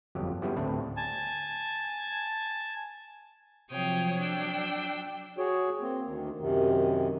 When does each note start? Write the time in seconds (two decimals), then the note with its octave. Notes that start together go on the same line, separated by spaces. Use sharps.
0.15 G1 F2 F#3 G4
0.42 G3 B3 C#4 E4 G4 G#4
0.56 D2 A2 C4 D4 E4
0.97 G#5 A5
3.70 C3 F3 F#3 C#5 G5 D#6
4.17 F#3 D4 G5 E6
5.38 F#4 G#4 C#5
5.81 A#3 C4
6.06 D2 D#3
6.40 F#2 C3 D#3